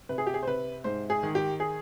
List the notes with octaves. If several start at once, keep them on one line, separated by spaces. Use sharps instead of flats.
C3 B4
G#4
G4
G#4
C5
C3 B4
G#2 C5
G#4
D#3
G4
G#4